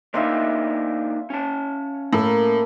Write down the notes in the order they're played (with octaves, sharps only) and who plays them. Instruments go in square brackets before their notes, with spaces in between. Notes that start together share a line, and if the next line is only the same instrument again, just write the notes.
[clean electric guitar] A#3 D4 D#4 [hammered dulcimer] E5 F5 C6
[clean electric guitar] C#4 A5
[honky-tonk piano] A2 [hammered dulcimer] A#3 A4 A#4